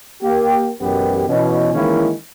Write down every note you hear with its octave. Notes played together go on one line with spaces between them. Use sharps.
A#3 G4
A1 F#2 B2 B3 G4
B2 E3 C#4
D#3 E3 G#3 A#3 C#4 E4